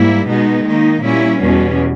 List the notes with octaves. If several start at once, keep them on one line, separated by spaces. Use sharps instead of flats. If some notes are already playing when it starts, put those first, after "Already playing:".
Already playing: G#2 G3 A#3 E4
B2 G#3 B3 D#4
D#3 A#3 D#4
A#2 G3 C#4 E4
E2 B2 G3 C#4